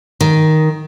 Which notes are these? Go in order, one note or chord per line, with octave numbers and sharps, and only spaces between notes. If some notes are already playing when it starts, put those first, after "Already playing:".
D#3